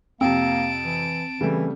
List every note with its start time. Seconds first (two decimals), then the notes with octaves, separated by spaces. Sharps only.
0.21 F2 C3 A#3 C4 A5 D7
0.85 E3
1.41 C#3 E3 G3 A3